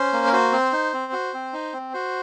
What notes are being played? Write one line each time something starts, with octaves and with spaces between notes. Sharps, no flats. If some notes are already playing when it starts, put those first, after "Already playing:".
Already playing: C#4 C5
A#3
A#4
F#4 C5
C4
D#4
C4
F#4
C4
D#4
C4
F#4 C5